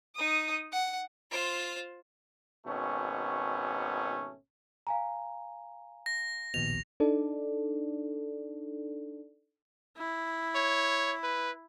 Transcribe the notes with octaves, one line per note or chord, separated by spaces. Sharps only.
D#4 D#6
F#5
F4 C5
G#1 B2 A3 C#4
F5 G#5 A#5
A#6
A#1 D#2 B2 F7
D4 D#4 A4 D5
E4
C#5
B4